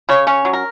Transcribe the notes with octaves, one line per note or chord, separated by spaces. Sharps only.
C#3 C#5
C#4 C#5
F#3
A#4